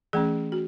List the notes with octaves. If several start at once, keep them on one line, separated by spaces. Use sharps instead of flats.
E3 A3 C#4 G#4
F#4